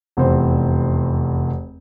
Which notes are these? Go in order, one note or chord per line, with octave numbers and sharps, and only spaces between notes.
F1 E2 C4 C5